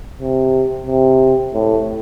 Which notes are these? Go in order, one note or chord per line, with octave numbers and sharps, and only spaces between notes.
C3
C3
A2